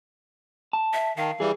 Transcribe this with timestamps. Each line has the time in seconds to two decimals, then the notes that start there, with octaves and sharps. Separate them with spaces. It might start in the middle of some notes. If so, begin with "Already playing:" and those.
0.73 A5
0.93 E5
1.17 D#3 F5
1.40 E3 G3 G#4